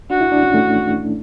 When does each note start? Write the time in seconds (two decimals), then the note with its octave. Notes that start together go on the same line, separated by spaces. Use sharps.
0.10 D4 F#4
0.21 E4
0.32 D4
0.43 C#4
0.54 A3